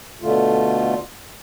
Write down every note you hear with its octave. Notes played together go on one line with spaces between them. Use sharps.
B2 D3 A3 F4